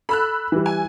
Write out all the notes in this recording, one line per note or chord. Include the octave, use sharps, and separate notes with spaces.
A4 B5 E6 F#6
E3 G3
G#5